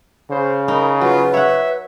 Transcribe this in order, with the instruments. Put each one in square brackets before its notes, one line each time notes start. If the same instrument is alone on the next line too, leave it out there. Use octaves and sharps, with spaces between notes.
[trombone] C#3 [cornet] C5
[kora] D#4 [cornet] A#4 [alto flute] B5
[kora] F#3 [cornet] F4 [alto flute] B4
[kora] C#5 F#5 [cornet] E5